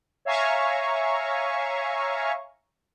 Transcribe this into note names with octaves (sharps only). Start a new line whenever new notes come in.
C#5 E5 F5 G#5 A#5 C#6